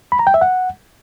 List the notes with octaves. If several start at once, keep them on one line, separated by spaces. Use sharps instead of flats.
B5
A#5
G5
E5
F#5